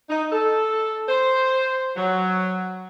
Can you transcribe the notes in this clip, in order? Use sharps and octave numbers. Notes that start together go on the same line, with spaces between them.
D#4
A4
C5
F#3